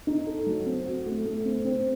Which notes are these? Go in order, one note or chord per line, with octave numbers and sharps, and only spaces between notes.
D#4
A4
F#3
C4
F#4
A3
A3
C4
C4